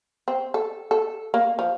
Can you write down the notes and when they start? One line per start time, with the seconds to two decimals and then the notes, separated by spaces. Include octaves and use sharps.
0.28 C4
0.54 A4
0.91 A4
1.34 A#3
1.59 F3